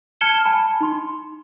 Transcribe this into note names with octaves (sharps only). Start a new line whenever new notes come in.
A5 F6 G#6 C#7 E7 G7
G#5 A5 B5
D#4 C6